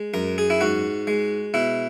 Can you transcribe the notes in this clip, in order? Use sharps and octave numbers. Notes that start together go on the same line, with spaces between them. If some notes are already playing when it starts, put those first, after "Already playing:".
Already playing: G#3
F#2 A#4
G#4
E4
G#2 F#4
G#3
B2 E4